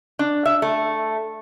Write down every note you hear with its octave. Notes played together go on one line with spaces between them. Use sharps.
D4
E5
A3